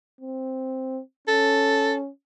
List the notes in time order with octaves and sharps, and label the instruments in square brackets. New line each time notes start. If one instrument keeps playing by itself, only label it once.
[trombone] C4
[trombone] C#4 [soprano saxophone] A4